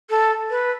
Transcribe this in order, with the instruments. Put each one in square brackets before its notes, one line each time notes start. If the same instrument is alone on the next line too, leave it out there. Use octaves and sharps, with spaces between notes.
[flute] A4
B4